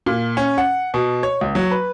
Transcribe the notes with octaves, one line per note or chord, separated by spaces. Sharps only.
A#2
C#4
F#5
B2
C#5
C#2
F#3
B4